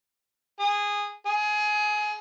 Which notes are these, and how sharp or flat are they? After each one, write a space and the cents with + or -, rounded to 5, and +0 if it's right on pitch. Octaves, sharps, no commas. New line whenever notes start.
G#4 -15
G#4 +20